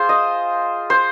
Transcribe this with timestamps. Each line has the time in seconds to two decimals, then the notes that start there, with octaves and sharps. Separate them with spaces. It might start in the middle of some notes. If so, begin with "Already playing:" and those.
Already playing: F4 G#4 C5
0.09 D#5
0.90 C5